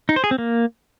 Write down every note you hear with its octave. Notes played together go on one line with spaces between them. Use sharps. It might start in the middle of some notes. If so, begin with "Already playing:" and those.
D#4
C5
G#4
C4
A#3